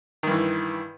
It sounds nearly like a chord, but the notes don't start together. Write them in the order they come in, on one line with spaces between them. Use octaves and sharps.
D#3 G2 E3